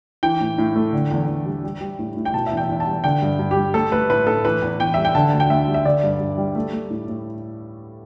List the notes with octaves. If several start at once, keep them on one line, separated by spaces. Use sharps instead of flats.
E3 G5
A2
A2
A3
D3
E2
E2
G3
G3
G3
A2
A2
G5
B2 A5
E5
E2
G5
E2
A5
G3
D3 G5
G2
G2
G4
G3
A3 A4
A3 B4
A2 B4
A2 A4
E3 B4
E2
E2 G5
G3 E5
G5
D3 A5
D2 A5
G5
D2 E5
G3
E5
D3 D5
G2
G2
G3
A3
A3
A2
A2